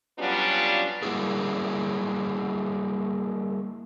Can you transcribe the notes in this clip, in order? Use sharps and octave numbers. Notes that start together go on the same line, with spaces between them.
F#3 G3 B3 C#4 D4 F4
G3 A#3 B3 E4 F#4 G#4